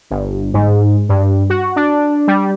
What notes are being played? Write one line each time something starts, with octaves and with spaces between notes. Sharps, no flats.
G1
G#2
G2
F#4
D4
G3